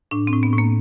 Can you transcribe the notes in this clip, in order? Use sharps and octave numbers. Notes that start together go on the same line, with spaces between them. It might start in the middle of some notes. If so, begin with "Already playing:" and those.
A2 D4
C4
A2
B3
A2
A#3